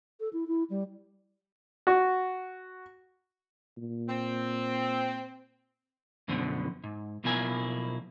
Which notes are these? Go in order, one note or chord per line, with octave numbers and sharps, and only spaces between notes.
A4
E4
E4
G3
F#4
A#2
C4
F#2 B2 D3 F3
G#2
B1 B2 F3 A#3 E4 G#5